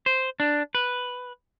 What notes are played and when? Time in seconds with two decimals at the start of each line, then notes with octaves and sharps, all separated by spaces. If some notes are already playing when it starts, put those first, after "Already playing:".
0.06 C5
0.40 D4
0.75 B4